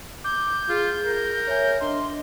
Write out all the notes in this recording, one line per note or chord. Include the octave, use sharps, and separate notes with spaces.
D6 G6
F4 G#4
A#4
C#5 E5 G#5
D4 D#5 C6